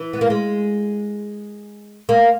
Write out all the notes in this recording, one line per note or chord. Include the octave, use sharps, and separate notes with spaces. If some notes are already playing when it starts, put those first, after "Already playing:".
Already playing: E3
B3
A#3
G#3
A#3